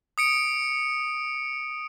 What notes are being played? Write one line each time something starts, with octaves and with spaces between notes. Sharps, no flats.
D#6 C#7 D7